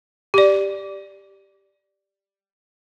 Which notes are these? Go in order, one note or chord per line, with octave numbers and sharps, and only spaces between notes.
G4 D5